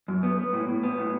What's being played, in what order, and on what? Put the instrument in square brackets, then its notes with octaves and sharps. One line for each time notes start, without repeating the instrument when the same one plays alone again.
[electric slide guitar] F#2
B3
B3
A2
A2
B3
A2